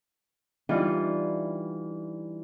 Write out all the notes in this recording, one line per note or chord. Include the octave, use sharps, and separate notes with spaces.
E3 G3 D4 D#4 F4